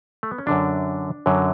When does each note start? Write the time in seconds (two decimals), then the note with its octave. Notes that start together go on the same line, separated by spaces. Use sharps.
0.23 A3
0.31 B3
0.38 C#4
0.46 F#2 D3 F#3 D4
1.26 F#2 D3 F#3